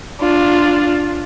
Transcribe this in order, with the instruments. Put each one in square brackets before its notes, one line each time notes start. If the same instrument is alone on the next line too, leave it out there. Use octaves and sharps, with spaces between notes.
[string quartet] D4 F4